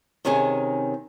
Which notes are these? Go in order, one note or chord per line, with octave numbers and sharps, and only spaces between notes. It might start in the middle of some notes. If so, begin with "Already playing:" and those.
C3 D#3 C#4 D#4 G#4